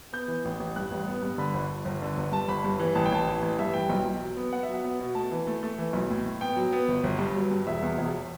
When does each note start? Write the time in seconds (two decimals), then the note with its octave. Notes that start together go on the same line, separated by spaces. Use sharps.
0.13 B3 G6
0.28 E3
0.45 A1
0.60 A1
0.76 G2 F#6
0.92 A1
1.07 B3
1.23 G2
1.38 D3 B5
1.54 G1
1.70 G1
1.85 G1
2.02 D3
2.17 G1
2.32 G2 A5
2.48 G1 B5
2.65 G2
2.79 E3
2.95 A1 A5
3.05 G5
3.12 A1 A5
3.27 E3
3.42 A1
3.59 G2 E5
3.73 E3 G5
3.89 B1 G5
4.06 B1
4.21 F#3
4.37 B3
4.52 B3 F#5
4.63 E5
4.69 F#3
4.74 F#5
4.84 B3
5.00 B2
5.15 A3 A5
5.32 E3
5.47 A3
5.63 A3
5.78 E3
5.93 B1
6.10 A2
6.26 A2
6.41 B3 G5
6.56 F#3
6.72 B3
6.88 G1
7.04 G1
7.19 G2
7.35 F#3
7.51 G2
7.67 E1 E5
7.82 E2
7.98 E1